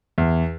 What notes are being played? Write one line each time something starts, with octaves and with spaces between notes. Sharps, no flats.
E2